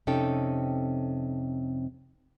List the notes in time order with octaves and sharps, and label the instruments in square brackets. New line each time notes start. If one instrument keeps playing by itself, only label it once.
[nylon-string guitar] F2 C3 C#4 D#4 A4 G5